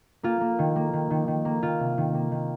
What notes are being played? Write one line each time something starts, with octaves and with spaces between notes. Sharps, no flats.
A#3 F4
A#3
D#3
A#3
D#3
D#3
D#3
A#3
D#3 F4
C3
D#3
A#3
D#3